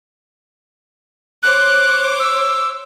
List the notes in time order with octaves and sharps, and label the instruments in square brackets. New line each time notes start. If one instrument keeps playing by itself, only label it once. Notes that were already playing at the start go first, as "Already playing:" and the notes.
[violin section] C5 C#5 D6 [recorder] F#6
[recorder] E6